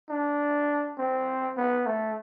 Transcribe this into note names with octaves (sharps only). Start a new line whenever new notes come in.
D4
C4
B3
A3